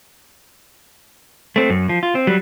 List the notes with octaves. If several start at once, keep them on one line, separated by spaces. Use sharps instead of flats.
A3 C4
F#2
F3
F4
C4
F#3 G3